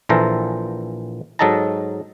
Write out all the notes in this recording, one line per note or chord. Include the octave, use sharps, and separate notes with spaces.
A#1 A#2 E3 A4 C5 A#5
G#2 F#3 A4 D#5 A5 A#5